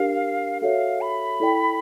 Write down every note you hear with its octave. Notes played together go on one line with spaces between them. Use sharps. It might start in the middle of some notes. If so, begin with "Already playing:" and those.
Already playing: D4 G4 A#4 D5 F5
F#4 A4 C#5 E5 F5
B5
E4 A4 D5 G5